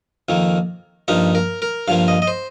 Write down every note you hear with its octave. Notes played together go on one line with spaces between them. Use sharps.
F2 D#3 A#3
G2 F3 A#3 D#4
A#4
A#4
G2 F3 A#3 F5
D#5
D#5
C5